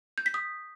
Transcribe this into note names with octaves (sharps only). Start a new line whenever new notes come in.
G6
B6
D#6